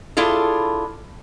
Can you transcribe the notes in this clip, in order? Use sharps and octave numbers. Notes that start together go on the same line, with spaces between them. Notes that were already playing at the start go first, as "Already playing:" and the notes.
D4 E4 F4 G#4 A4